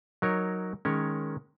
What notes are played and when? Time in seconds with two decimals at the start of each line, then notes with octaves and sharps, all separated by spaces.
0.22 F#3 D#4 A#4 C#5
0.85 D#3 G#3 C#4 A#4 C#5